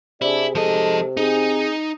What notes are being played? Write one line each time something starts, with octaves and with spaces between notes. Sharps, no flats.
C3 D4 E4 G#4 D5
F3 G#3 D#4 G#4 A4 D#5
C4 D#4 G#4